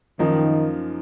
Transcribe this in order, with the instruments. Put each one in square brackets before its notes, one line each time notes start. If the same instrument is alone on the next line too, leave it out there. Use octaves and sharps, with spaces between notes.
[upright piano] F#2 F3 A#3 D#4 [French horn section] D#3